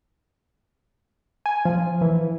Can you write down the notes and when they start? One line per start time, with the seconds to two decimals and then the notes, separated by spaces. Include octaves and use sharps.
1.46 G#5
1.65 F3
2.01 E3